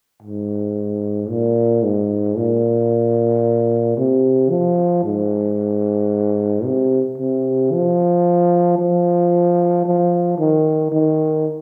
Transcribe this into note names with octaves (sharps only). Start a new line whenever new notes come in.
G#2
A#2
G#2
A#2
C3
F3
G#2
C3
C3
F3
F3
F3
D#3
D#3